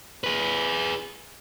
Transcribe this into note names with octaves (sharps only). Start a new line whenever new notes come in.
G#4 B4